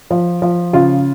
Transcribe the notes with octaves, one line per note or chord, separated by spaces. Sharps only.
F3
F3
C#3 F4